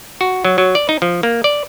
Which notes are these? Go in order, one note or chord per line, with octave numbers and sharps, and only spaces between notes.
F#4
F#3
F#3
D5
D#4
F3
A#3
D5